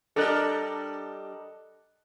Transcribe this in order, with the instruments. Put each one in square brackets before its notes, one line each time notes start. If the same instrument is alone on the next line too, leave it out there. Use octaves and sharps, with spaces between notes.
[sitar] G3 D4 A#4 [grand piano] A4 D#5 F#6